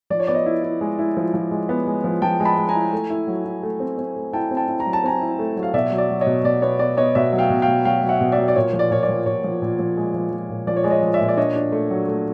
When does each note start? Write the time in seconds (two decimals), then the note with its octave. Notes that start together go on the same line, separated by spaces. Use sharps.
0.10 F3 D5
0.19 C#5
0.27 B3 D5
0.34 C#5 D#5
0.46 E4
0.63 E4
0.81 G#3
0.99 E4
1.17 F3
1.34 F3
1.51 G#3
1.69 B3
1.87 G#3
2.04 F3
2.22 F3 G5 A5
2.40 G#3
2.45 A5 B5
2.57 G#3
2.69 G#5 A#5
2.75 E4
2.92 A3
3.10 E4
3.27 F#3
3.45 E4
3.63 A3
3.80 C4
3.98 C4
4.16 A3
4.33 E4 G5 A5
4.51 C4
4.57 G5 A5
4.68 E4
4.80 A#5
4.86 F#3
4.93 A5
5.04 C4 G#5 A#5
5.21 E4
5.39 A3
5.56 F#3
5.63 F5
5.74 B2 D5 E5
5.92 F#3
5.98 D5
6.10 F#3
6.21 C#5 D#5
6.27 B2
6.44 B2 D5
6.62 B3 C#5
6.79 B3 D5
6.97 B3 C#5 D#5
7.15 B2 D5 E5
7.32 F#3
7.38 F5 G5
7.50 B2
7.62 F5 G5
7.68 B2
7.85 F#3 F5 G5
8.03 F#3
8.09 E5 F#5
8.21 B2
8.32 D5 E5
8.38 F#3
8.48 D5
8.56 A#2 C#5
8.73 F3
8.79 D5
8.91 A#2 C#5
9.03 D5
9.09 F3
9.26 A#2 C#5
9.44 F3
9.62 A#2
9.79 F3
9.97 G#3
10.14 F3
10.32 F3
10.49 A#2
10.67 F3 D5
10.77 C#5
10.84 G#3 D5
10.91 C#5 D#5
11.03 F3
11.14 D5 E5
11.20 A#2
11.28 D5
11.37 D4 C#5 D#5
11.56 D4
11.72 A3
11.91 F#3
12.08 A3